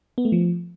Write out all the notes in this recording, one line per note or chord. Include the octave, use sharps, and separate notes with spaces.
B3
A3
F3